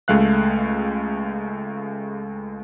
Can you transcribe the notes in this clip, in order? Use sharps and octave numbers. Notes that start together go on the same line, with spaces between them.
C#2 G#3 A3 F5 F#6